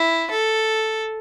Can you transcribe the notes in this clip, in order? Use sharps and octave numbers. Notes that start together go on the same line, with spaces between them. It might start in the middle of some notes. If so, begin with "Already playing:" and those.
Already playing: E4
A4